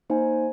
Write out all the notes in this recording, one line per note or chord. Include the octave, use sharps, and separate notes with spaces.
A#3 D#4 C5 G#5